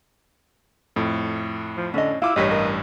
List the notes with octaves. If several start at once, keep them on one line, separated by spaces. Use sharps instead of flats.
F2 A2
F3
D3 C#4 D#5
E4 F4 F5 D6 E6
A1 G2 G4 A#4 C#5 D#5 B6
A#4